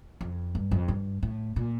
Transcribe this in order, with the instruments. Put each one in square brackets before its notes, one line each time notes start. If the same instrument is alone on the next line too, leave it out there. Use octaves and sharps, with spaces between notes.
[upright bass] F2
G2
F2
G2
A2
A#2